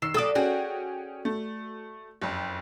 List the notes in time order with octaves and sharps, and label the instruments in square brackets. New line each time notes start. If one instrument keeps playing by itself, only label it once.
[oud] D#3 [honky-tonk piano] E6 C7 E7
[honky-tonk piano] B1 D#6 [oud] A4 D5
[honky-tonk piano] C#4 G#4 G5 [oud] F#4
[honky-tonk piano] A3
F#1 F2